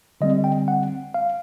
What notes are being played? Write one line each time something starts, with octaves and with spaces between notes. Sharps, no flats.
D3 G3 C4 D#5
G5
F#5
F5